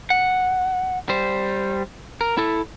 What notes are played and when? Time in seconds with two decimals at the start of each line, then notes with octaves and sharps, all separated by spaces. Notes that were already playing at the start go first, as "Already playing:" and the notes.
0.10 F#5
1.09 G3 C5
2.21 A#4
2.37 E4 A4